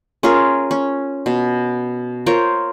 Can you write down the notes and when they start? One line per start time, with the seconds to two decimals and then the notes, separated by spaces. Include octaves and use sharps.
0.23 C#4 F4 G#4 A#4
0.71 C#4
1.26 B2
2.26 F4 A#4 C5 C#5